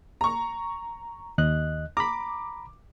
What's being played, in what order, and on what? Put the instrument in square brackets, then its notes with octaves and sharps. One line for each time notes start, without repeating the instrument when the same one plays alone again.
[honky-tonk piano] A#5 C#6
[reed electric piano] D#2 D#5 F#6
[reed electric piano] A#5 B5 [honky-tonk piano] D6